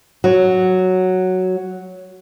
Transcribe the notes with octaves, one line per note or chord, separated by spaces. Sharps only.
F#3